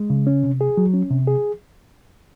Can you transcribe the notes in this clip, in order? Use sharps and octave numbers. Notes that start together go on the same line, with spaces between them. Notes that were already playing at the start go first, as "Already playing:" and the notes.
Already playing: G#3
C#3
C#4
C3
G#4
F#3
C#4
C3
G#4